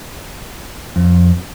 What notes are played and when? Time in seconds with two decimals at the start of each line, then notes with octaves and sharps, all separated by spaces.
0.96 F2